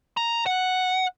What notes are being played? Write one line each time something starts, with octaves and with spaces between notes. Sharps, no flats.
A#5
F#5